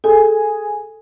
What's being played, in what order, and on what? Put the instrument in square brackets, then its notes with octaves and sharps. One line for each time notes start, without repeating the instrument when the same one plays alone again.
[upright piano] G#4 G#5 [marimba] A4